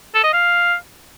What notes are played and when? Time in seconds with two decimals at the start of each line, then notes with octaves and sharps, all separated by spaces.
0.15 A4
0.24 D#5
0.33 F5